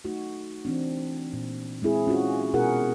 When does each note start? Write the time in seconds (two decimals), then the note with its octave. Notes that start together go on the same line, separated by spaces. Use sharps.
0.04 A3 D#4 F#4
0.65 E3 C4 D4
1.33 A#2
1.82 G#3 C4 E4 G#4
2.07 C#4 F4 F#4
2.54 B2 E4 F#4 G#4 A#4 F#5